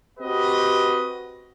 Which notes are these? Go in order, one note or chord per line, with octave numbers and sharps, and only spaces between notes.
C4 F#4 G4 B4 D#5